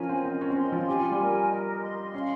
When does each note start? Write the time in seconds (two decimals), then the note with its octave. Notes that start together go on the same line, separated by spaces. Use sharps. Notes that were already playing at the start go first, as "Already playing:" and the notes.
Already playing: F3 C#4 F4 A#4 G#5
0.09 C4
0.25 C4 D#5
0.41 C#4
0.50 C4
0.56 C#4 C6
0.72 F3 F4
0.88 G4 G#5
1.00 F4
1.11 G3 G4
1.20 A#4
1.51 D#5
1.82 C6
2.14 C#4 F5